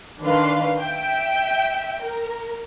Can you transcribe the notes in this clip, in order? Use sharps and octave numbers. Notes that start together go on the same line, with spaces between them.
D#3 D4 B4 F5 C6
E5 G5
A#4